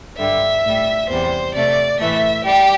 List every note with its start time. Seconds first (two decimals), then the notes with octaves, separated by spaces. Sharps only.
0.18 G2 D3 G3 E5
0.64 A2 G3
1.09 E2 C3 G3 C5
1.54 C3 A3 D5
1.99 A2 E3 A3 E5
2.45 G3 G4